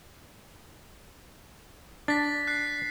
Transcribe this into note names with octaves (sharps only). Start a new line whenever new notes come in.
D4 A6 B6
F#6 C7